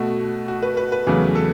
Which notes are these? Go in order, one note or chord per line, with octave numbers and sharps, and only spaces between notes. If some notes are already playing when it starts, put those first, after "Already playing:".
Already playing: B2 A3 F#4
F#4
B4
B4
B4
E2 C#3 F#3 A3
A4